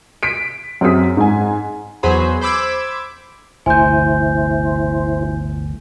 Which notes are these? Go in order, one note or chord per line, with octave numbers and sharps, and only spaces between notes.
B6 D7
F#2 C4 G#4 D#6 B6
G#2 G#5
E2 F#3 G#4 C5 B5
C5 B5 D6 E6 G#6
G1 D2 C3 E4 C5 G#5 G6